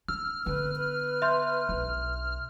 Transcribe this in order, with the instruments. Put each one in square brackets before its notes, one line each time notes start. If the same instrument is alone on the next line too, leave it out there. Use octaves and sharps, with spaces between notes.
[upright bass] D4 [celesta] E6 [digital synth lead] F6
[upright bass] D3 B3 [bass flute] B4
[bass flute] B4
[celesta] E5 C6 G6
[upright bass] B1 D4